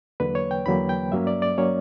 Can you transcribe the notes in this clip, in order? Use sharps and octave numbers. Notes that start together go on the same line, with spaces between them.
E2 D3 F#3 A#3 B4
C#5
G5
E2 D3 F#3 A#3 B5
G5
G2 F#3 A#3 C#4 E5
D5
D5
F#3 A#3 C#4 C#5